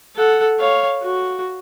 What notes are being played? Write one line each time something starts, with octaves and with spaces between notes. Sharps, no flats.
A4 F#5
C#5 F5
F#4